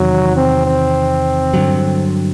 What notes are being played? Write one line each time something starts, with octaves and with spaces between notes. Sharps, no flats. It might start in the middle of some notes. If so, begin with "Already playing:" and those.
Already playing: E2 C3 D#3 F#3
C4
C4
G2 D3 F#3